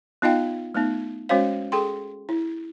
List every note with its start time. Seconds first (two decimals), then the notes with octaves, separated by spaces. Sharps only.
0.22 B3 D#4 F4 D#5 F5 G5
0.74 A3 B3 D#4
1.29 G#3 C#4 F#4 C5 C#5 F5
1.72 G#4 A4 G5 C6
2.29 E4